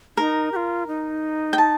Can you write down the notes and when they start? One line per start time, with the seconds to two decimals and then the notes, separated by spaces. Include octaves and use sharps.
0.17 D#4 A#4
0.52 G4
0.56 F4
0.87 D#4
1.53 G5
1.58 A5